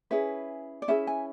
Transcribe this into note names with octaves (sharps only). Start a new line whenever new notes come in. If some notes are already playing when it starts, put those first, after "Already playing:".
C#4 E4 G#4 B4
D5
C#4 E4 G#4 B4 E5
G#5